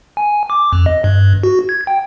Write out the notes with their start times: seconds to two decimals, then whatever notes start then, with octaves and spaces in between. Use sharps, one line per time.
0.17 G#5
0.50 D6
0.73 F2
0.86 D#5
1.04 G2
1.43 F#4
1.69 G#6
1.87 G5